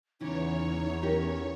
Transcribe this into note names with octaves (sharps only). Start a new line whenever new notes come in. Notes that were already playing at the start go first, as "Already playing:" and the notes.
E2 C#3 E3 D#4 C#5
C#4 G4 A#4